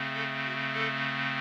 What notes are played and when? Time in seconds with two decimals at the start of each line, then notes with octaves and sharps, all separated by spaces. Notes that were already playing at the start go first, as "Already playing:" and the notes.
Already playing: C#3 A3 C4
0.14 A4
0.44 F#4
0.74 A4